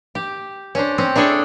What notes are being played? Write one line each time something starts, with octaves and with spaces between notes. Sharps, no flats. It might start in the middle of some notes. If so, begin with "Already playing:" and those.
G4
C#4 D4 C5
C4 C#4
D4 E4 G#4 A4 C#5